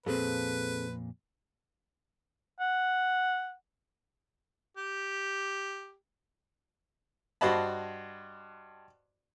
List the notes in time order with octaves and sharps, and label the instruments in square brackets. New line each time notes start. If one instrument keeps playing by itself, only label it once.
[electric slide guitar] F2 A#2 [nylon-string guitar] C4 G#4 A4 [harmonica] B4
[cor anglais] F#5
[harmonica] G4
[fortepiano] G2 F#4 C5 D#5 A5 B5